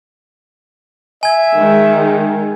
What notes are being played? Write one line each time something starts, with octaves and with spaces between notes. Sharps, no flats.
E5 G#5 G#6
D#3 G#3